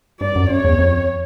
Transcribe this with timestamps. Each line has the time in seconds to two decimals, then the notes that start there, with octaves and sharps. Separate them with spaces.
0.20 G2 D5
0.36 F#2
0.50 F#2 C#5
0.65 E2
0.79 F2